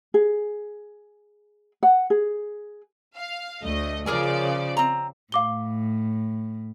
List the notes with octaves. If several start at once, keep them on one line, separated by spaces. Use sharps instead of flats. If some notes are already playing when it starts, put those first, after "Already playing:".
G#4
F#5
G#4
F5
D2 A3 D#5
C#3 F3 G#4 A#4 D5 G#5
C4 A#5
A2 F5 D6 G7